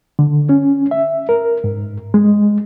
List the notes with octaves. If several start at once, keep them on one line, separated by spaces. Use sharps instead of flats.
D3
C#4
E5
A#4
G#2
G#3